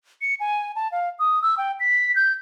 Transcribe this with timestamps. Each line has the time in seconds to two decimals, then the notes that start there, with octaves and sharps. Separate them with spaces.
0.21 C#7
0.40 G#5
0.76 A5
0.92 F5
1.19 D#6
1.42 E6
1.58 G5
1.80 B6
2.16 G6